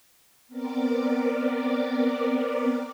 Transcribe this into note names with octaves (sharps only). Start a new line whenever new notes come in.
B3 C4 A#4 D5 D6